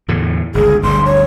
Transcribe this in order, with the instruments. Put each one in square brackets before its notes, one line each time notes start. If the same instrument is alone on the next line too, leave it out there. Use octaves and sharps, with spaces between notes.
[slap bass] E2 A2 D3
[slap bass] G1 C#2 [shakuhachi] G#4
[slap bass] G1 D2 G3 [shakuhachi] C6
[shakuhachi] C#5